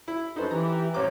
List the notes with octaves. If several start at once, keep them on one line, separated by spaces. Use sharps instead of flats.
E4
F#2 D#4 A4 B4 C5
E3 G4 A#5
A1 C5 C#5 A#5 D6